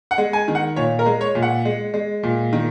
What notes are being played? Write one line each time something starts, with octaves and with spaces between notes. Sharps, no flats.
F#5
G#3
G#5
D#3
F#5
A#2 C#5
A#4
G#3
C#5
A#2
F#5
G#3
G#3
A#2
D#3